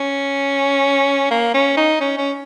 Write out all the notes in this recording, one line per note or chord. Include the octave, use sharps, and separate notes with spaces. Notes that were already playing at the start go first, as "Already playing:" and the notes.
Already playing: C#4
A#3
C#4
D#4
C#4
C#4